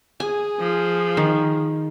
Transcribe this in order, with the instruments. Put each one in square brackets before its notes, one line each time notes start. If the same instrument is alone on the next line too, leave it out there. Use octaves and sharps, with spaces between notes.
[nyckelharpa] G#4 [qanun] G#5
[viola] F3
[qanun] D#3